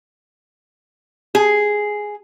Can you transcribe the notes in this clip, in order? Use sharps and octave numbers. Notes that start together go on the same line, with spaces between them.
G#4